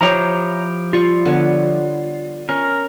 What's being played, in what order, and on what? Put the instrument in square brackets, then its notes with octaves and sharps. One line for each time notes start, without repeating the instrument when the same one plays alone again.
[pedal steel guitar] F3 E4 G4 [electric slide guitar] C5 C#5 A#5
[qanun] G3 C#6 [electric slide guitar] F4
[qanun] D3 B3 C#5
[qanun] C#4 [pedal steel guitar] A#4